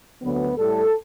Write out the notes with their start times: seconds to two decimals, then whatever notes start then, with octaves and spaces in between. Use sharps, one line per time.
0.22 D2 D3 F#3 B3
0.56 A2 G3 A4